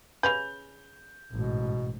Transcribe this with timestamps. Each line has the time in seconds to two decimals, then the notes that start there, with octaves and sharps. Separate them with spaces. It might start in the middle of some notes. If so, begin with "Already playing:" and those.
0.23 C#3 C#4 B4 G6 F7
1.32 A1 G#2 B2